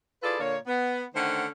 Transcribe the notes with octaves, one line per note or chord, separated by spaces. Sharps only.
E4 F4 G#4 A4 B4 D5
A#2 D3 A#3 C#5
B3
D3 D#3 A3 C#4 C5 F#5